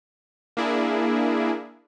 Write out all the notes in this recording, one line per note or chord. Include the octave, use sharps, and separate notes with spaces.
A#3 D4 E4 G#4